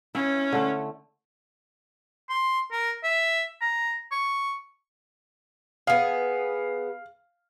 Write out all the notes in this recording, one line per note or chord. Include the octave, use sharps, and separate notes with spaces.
C#4 E4
D3 A3
C6
A#4
E5
A#5
C#6
B3 G#4 F5